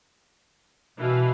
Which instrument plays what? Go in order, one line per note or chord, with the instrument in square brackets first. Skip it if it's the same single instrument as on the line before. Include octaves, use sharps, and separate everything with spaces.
[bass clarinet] B2 [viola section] E3 B4 F5